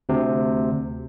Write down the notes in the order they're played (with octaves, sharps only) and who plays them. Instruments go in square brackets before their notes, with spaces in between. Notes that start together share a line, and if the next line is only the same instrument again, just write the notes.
[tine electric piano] D2 C3